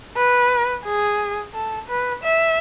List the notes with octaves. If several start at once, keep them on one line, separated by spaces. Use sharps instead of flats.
B4
G#4
A4
B4
E5